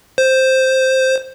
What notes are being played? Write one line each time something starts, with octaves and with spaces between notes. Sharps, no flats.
C5